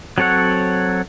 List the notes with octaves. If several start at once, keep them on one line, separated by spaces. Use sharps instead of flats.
F#3 C4 A4 C#5 F#5